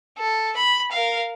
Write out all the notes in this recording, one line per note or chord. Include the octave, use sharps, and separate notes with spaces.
A4
B5
A#4 F5